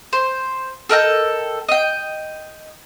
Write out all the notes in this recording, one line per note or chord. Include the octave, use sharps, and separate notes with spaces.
C5
A4 A#4 D#5 G5
D#5 G5